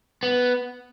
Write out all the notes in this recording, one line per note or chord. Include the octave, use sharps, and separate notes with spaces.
B3